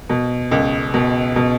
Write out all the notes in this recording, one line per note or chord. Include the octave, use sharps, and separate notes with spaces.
B2
C#2
B2
B2